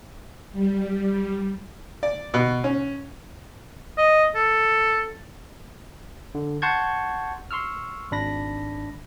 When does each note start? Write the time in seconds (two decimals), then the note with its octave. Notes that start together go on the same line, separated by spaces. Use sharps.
0.53 G3
2.03 D5
2.34 B2
2.64 C#4
3.98 D#5
4.35 A4
6.35 D3
6.62 F#5 A5 C6 C#6 G6 G#6
7.51 C6 C#6 E6 F6
8.11 G#1 D4 B5 A#6